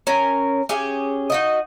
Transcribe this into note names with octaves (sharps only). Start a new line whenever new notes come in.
C#4 A#4
C#4 G4 G#4
D#4 F#4 D#5